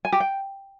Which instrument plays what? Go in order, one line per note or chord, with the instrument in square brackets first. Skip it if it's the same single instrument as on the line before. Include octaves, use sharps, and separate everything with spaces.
[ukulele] G#5
G4
G5